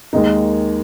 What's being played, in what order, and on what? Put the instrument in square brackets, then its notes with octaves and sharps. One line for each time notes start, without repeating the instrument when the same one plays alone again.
[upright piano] D#2 D#3 G#3 D#4